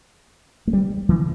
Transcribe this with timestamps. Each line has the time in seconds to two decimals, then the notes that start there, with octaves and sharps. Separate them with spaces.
0.67 A3
0.73 G3
1.09 E3